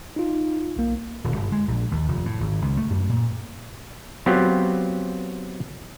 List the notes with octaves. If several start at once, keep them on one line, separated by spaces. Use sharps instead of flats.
D#4 F4
B1 A#3
D#1
G1
G#3
A#1
D#2
F1
A2
G#1
C#2
A3
F#2
A#2
F#3 B3 C4 F4 G4